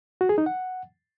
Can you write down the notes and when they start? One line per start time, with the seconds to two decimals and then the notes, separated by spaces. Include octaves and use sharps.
0.21 F#4
0.29 G#4
0.38 D#4
0.46 F#5